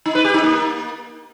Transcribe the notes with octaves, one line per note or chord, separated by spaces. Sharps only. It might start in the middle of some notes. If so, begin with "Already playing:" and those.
D#4
B4
G4
D#4
A#3